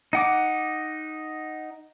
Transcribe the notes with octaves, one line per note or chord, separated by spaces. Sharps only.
D#4 F#5 D6